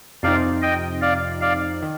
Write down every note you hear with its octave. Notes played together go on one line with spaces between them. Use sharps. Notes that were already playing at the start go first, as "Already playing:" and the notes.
F2 C3 F3 C4 D#4 D5 F5
D#5 G5
D5 F5
D5 F5
D#3